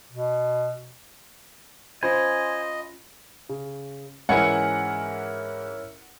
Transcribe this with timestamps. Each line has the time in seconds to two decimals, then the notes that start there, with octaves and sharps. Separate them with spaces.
0.12 B2
2.03 C#4 F4 C5 D#5 G#5 B5
3.49 C#3
4.29 G#2 E3 C#4 E4 A#4 F#5 G#5 C#7